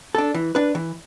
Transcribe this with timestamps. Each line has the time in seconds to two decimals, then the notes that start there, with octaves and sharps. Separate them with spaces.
0.15 D4 A4
0.34 E3
0.55 D4 B4
0.75 E3